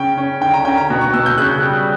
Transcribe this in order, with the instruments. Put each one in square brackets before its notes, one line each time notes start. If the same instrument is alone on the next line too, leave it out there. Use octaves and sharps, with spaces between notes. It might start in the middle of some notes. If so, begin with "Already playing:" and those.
Already playing: [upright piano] C#3 C#4 G5
C#4
D3 G5
A#5
C#4 G5
A#5
B2
C#6
B2 E6
G6
C#3 F#6
G3